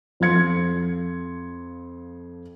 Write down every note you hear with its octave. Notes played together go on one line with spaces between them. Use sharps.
F2 F3 C6 G#6 C#7